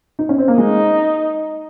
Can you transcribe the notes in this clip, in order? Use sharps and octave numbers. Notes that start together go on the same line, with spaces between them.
D#4
C#4
C4
A#3
G#3 D#4